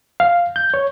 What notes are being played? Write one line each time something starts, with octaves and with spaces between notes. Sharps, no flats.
F5
G6
C#5